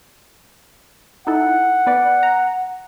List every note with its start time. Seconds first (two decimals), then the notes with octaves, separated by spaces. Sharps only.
1.27 D#4 E4 A4 F#5
1.87 B3 B4 D5
2.23 A#5